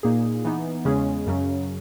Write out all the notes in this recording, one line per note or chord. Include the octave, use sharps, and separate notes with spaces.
A#2 A#3 D#4 G#4
E3 B3 D#4
E2 C#3 G#3 C#4 G#4
F#2 C#3 F#3 C#4